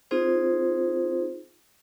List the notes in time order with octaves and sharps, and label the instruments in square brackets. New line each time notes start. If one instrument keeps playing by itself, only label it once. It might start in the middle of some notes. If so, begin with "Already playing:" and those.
[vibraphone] C4 D#4 F4 G#4 C5